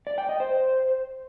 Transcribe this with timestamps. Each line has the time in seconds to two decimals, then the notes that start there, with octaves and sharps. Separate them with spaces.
0.07 D5
0.18 G5
0.29 D#5
0.40 C5